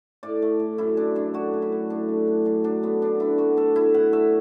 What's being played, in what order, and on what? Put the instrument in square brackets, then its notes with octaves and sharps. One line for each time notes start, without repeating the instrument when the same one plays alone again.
[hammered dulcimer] A2 D5
A3
A2
F#2 E4
F#2 D4
F#2 D4
A2 F#4
A2
E4
A3
A2 D4
A3
A2
F#2 D4
F#3 D4
A3 B3
D3 D4
D3 E4
D3 F#4
A2 A4
A2 E4
A2 F#5
A3 E5